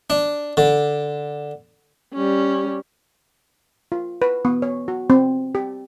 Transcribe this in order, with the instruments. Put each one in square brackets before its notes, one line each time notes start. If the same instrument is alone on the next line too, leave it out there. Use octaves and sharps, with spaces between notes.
[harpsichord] D4
D3
[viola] G3 C#4
[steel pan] F4
B4
B3
C#5
F#4
C4
G4